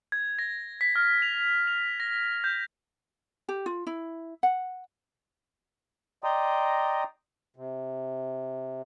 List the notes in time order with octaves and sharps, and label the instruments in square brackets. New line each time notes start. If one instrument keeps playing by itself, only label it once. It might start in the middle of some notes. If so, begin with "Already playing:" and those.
[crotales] G#6
A#6
B6
F6
F7
F7
A#6
G6
[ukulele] G4
F4
E4
F#5
[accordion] D5 D#5 G5 A#5 C6 D#6
C3